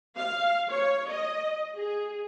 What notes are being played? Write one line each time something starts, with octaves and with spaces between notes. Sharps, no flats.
F5
C#5
D#5
G#4